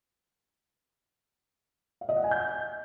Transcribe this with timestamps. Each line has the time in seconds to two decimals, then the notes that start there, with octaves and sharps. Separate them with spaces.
2.01 F5
2.09 D#5
2.16 F#5
2.24 G#5
2.31 G6